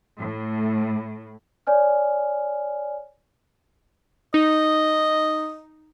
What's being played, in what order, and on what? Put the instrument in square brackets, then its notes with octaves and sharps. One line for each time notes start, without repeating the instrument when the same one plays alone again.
[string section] A2
[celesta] C#5 D5 G#5 F6
[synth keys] D#4 [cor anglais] D#5